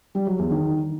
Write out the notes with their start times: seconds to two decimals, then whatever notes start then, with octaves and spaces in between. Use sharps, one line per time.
0.15 G3
0.27 F#3
0.39 E2
0.51 D#3